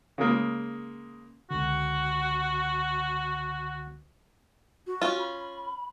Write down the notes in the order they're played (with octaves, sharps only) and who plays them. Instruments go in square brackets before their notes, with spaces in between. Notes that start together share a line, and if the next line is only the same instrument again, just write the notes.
[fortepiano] C#3 G#3 A#3
[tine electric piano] C#2 D3 [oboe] F#4
[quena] F#4
[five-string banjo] C#4 F4
[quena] B5